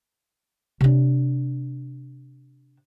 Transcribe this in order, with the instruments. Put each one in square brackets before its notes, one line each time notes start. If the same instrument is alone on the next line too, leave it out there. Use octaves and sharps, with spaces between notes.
[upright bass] C3 D4